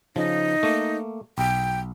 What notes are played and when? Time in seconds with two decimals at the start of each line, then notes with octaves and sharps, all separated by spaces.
0.16 C#3 F3 D#4
0.63 A3 A#3
1.38 B1 G5